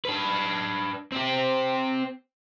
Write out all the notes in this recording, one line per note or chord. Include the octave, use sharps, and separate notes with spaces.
D4 B4
C4 G4